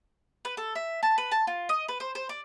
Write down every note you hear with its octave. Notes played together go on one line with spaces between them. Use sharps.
B4
A4
E5
A5
B4
A5
F4
D#5
B4
C5
C5
D5